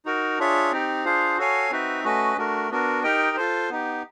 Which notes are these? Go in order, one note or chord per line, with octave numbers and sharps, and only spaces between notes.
D#4 F#4 A#4
D4 F4 G#4 C#5 E5
C4 D#4 G4
D4 F4 G#4 C5 F5
F#4 A4 C#5 F5 G#5
C4 D#4 F#4 B4 E5
A3 C#4 F#4 B4 D#5
A3 D4 F#4 A#4
B3 D4 F#4 A#4
D#4 G4 A#4 D#5 G5
F4 A4 C5
B3 D#4 G4